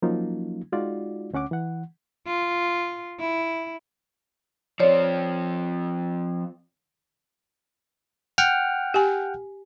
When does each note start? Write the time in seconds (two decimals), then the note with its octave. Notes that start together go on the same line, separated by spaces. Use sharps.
0.02 F3 F#3 A#3 C#4 D#4 F4
0.72 G#3 D#4 F4 F#4 D5
1.33 D2 C#4 F#5 D6
1.51 E3 F#5
2.27 F4
3.20 E4
4.80 F3 C4 C#5 D5
8.38 F#5 G5 F6
8.94 G4 G#5